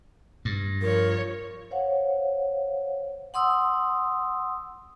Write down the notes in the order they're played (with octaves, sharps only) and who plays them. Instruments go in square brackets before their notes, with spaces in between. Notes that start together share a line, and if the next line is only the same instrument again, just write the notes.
[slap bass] G2
[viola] F3 C#5 [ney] A#4
[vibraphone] C5 C#5 F5 F#5
F#5 C6 D#6 E6